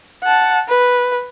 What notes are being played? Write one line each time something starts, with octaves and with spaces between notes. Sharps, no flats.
F#5 A5
B4